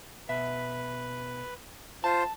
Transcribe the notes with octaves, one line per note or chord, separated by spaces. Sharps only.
B2 B4 E5
F4 C5 A5